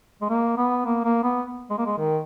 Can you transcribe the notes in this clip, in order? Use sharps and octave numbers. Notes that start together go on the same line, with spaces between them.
G#3
A#3
B3
A#3
A#3
B3
G#3
A#3
G#3
D#3